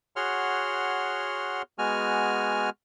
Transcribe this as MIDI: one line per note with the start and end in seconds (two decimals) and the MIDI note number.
0.16 1.62 66
0.16 1.62 68
0.16 1.62 73
0.16 1.62 78
0.16 1.62 84
0.16 1.62 89
1.78 2.70 56
1.78 2.70 59
1.78 2.70 66
1.78 2.70 80
1.78 2.70 89